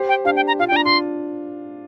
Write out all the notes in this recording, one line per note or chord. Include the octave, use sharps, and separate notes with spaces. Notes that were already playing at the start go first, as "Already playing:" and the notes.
Already playing: G4 C5
G5
D4 G4 F5
G5
A#5
F4 F5
G5
D4 A#5
F4 C6